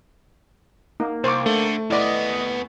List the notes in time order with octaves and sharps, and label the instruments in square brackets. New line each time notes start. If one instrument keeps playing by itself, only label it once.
[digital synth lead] A#3 [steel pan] D#4
[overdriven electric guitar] C2 [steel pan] C5 C#6 D6
[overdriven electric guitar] D3 [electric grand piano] A3
[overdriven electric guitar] D#2 B3 [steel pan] E4 D5 [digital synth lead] D#5